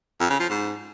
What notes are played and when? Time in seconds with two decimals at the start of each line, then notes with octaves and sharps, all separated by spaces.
0.20 F2
0.30 C#3
0.40 F3
0.50 G#2